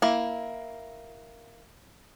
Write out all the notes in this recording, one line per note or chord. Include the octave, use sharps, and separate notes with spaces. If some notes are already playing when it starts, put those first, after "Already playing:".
A#3 E4